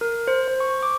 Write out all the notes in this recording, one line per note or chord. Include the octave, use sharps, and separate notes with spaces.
A#4
C5
C5
C#6
D6